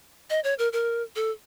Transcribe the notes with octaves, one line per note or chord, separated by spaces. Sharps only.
D#5
C#5
A#4
A#4
A4